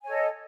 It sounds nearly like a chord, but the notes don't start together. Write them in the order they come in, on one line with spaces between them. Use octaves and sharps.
G#5 C#5 A4 D#5